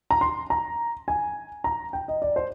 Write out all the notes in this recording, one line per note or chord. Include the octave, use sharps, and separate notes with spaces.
A#5
C6
A#5
G#5
A#5
G5
D#5
D5
C5